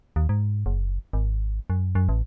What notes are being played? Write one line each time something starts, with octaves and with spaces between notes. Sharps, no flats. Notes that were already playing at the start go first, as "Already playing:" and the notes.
D#2
G#2
F#1
G#1
F#2
F#2
A1